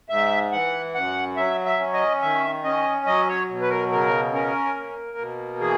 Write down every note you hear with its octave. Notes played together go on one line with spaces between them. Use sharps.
G#2 E5
E3 F#5
F#2 F#5
F#3 E5
E5
C#4
D#5
D#3 E5
C#4 D#5
F#3 D#5
C#5
B2
B4
A#4
C#3 A#4
C#4 A#4
A#3
B2
E3 G#4